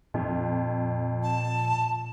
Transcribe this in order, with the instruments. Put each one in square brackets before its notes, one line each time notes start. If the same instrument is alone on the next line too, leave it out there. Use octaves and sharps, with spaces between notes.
[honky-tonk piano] F2 [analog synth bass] A#2
[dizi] A5